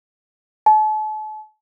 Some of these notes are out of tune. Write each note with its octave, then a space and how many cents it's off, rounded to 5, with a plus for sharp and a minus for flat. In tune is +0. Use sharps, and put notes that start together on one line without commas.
A5 -40